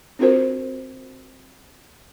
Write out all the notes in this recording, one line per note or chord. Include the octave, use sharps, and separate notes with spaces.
C4 D4 F4 F#4 A#4 C5